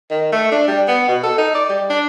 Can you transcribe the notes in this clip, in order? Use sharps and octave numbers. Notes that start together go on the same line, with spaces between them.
D#3
A3
D4
G3
B3
B2
A4
D#4
D5
G3
D4